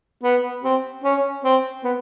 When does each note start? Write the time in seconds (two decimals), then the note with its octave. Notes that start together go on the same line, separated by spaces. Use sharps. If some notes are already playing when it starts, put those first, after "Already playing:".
0.24 B3
0.64 C4
1.04 C#4
1.44 C4
1.84 B3